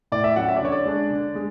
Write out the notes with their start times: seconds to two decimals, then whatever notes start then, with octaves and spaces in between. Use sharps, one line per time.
0.12 A2 D5
0.24 E5
0.36 F#3 C#4 E4 F#5
0.49 E5
0.56 D5
0.61 D3 C#5
0.72 D5
0.86 G#3 D4
1.10 D3
1.35 G#3